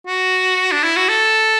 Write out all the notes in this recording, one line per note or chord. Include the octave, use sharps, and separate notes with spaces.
F#4
D4
E4
F#4
A4